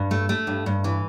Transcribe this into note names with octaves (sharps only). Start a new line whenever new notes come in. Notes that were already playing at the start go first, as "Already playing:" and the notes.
Already playing: G2
A3
A3
G2
G2
E3